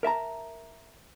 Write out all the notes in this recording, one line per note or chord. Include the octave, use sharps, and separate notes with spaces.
A#4 E5 A5 A#5